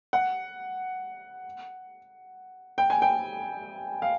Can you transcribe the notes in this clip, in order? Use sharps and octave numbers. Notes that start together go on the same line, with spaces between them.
F#5
G5
G#5
G5
F5